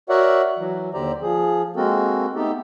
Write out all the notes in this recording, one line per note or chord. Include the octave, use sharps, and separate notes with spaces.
F#4 A#4 C#5 D5 E5 F#5
E3 F#3
D#2 D3 G4 C5 D5 A#5
F3 G#4
G#3 A#3 C4 F#4 A4 A#4
A3 B3 D#4 G4 A4